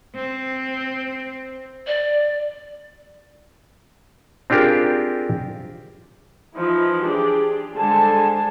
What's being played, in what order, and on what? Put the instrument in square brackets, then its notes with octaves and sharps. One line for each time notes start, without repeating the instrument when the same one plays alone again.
[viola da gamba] C4
[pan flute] D5
[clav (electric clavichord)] C4 D4 F4 G4 G#4 A#4
[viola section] E3 F3 D#4 E4
D4 G4 G#4
D3 G3 G#3 C5 G#5 A5